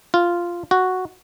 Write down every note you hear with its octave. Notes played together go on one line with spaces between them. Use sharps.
F4
F#4